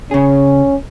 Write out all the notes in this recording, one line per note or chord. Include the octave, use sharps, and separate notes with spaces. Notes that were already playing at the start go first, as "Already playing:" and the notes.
C#3 C#4 G#4